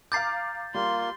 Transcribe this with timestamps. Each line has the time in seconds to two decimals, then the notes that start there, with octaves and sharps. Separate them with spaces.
0.12 F5 A#5 D6 G6 A6 C7
0.75 G3 A#3 F4 C6